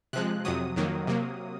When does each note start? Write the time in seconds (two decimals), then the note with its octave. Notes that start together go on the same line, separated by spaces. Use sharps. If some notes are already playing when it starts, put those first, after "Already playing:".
0.13 C3 F3 G#3 F#6
0.45 F2 C3 F#3 D#6
0.76 F2 D#3 F#3 A#3
1.07 C3 F#3 A#3